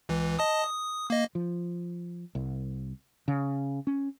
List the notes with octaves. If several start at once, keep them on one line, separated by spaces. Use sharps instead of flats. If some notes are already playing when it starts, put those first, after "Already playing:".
C#2 E3
D#5 A5 D#6
D#6
A#3 D#5
F3
C2
C#3
C#4